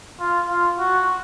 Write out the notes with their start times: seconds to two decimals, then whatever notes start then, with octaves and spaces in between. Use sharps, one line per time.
0.19 F4
0.49 F4
0.79 F#4